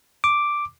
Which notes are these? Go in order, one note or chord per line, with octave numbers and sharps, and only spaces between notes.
D6